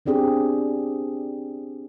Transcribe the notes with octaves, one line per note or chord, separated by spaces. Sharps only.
B3 C4 D4 G4 G#4